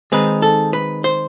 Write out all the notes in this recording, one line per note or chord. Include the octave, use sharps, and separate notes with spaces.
D#3 G#3 C4 D#4 B4
A4
B4
C5